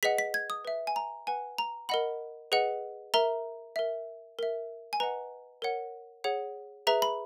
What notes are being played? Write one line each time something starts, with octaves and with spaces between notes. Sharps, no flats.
G#4 B4 D#5 F#5 B6
B6
G#6
D#6
B4 E5
G#5
A#5
B4 F#5 G#5
A#5
A#4 D#5 F#5 B5
G#4 B4 D#5 F#5
A#4 E5 A#5
A#4 E5
A#4 E5
G#5
B4 D#5 F#5 A#5
A#4 C#5 F#5
G#4 C#5 F#5
G#4 B4 E5 A#5
B5